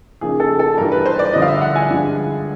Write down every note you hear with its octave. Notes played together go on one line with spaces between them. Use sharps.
C#3 F3 A#3 D#4 G#4
A4
A4
G2 E3 G3 A#4
B4
C5
D5
G2 D3 F3 D#5
F5
E5
F#5
G#5
G2 D3 F3 G#3